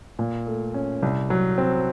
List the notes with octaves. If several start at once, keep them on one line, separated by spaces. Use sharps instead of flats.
A#2
A3
C#4
C2
F#3
C4